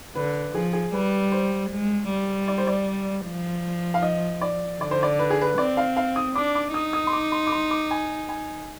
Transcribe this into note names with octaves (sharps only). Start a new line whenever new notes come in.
D3 B4
F3 G#4
G#4
G3 B4
C5
G#3
G3
D5
C5
D5
F3
F5
D#5
D5
D3 D5
C5
D5
B4
G#4
B4
C4 D5
F5
F5
D#6
D4 D6
D6
D#4 D#6
D#6
C6
D6
C6
D6
C6
D6
G#5
G#5